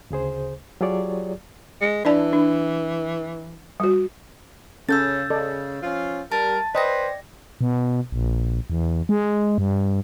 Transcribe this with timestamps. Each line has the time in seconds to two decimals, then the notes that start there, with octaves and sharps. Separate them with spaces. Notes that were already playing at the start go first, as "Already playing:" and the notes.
0.10 D2 C#3 G#4 C5
0.81 F#3 F4 G4 G#4 C#5 D5
1.81 G#3
2.05 E3 D4 D5 A5
2.33 D4
3.80 G3 F#4
4.89 C#3 C#4 A4 E6 G6 A6
5.30 C#3 A4 D5 D#5
5.82 F3 C#4 F4
6.32 G3 A#4 A5 A6
6.75 B4 C5 D5 D#5 G5 A#6
7.61 B2
8.12 A#1
8.70 E2
9.09 G#3
9.58 G2